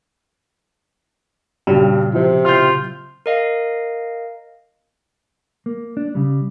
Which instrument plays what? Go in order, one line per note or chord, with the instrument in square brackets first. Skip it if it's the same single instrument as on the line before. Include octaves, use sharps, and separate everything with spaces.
[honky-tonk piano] G2 [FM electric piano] A#2 C#3 F#3
[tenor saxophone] C3 [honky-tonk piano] F3
[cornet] F4 [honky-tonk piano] F6 G6
[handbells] A#4 D#5 F5
[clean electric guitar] A#3
D4
C#3 G3